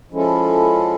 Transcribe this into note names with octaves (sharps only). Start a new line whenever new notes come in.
F3 G#3 C#4 E4 A4